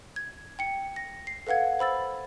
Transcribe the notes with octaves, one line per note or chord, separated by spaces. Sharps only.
G#6
G5 C#7
A#6
C7
A4 B4 F5 F#5 G#6
C5 B5 E6 A6